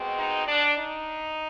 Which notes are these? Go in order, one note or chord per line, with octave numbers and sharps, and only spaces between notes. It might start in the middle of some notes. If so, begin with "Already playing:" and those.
Already playing: B2 G#3 C4
D#4
D4
D#4